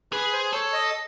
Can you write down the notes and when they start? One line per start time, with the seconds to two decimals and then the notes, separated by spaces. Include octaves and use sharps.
0.12 G#4 B4
0.33 C5
0.53 A4 C#5
0.73 D#5